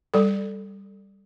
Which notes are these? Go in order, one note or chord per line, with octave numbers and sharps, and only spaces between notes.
G3 A4